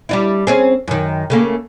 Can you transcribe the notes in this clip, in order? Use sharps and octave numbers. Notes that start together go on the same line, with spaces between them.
G3 D4 E4
C4 C#4 G#4
F#2 D#3
C#3 A3 A#3